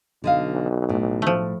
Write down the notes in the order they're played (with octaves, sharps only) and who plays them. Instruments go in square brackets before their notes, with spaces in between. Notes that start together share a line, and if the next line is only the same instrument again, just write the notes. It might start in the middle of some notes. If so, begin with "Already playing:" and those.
[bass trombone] B1 [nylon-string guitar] D3 D#5 F5
[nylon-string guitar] A2
[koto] F3 A3